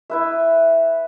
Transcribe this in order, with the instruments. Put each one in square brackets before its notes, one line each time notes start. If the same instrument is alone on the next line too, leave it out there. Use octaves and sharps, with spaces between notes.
[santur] E4 B4 E5